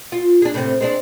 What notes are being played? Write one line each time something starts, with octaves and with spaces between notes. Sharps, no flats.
F4
D4 G#4
A2 C3 C4
G#3 C4 D4